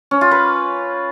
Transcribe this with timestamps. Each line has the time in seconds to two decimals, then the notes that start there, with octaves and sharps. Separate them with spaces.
0.11 C#4
0.21 F4
0.31 B4